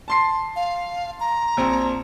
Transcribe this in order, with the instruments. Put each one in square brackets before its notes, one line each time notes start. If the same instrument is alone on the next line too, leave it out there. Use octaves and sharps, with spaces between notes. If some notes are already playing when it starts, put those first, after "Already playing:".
[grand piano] A5 C6 C7
[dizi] F5
A#5
[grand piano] A#1 C4